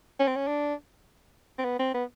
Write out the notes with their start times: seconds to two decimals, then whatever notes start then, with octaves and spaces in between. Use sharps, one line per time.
0.20 C#4
0.27 C4
0.36 C#4
0.48 D4
1.58 C4
1.64 B3
1.79 C4
1.94 B3